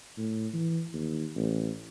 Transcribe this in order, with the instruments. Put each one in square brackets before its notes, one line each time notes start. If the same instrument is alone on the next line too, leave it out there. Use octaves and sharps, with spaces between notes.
[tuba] A2
E3
D#2
A1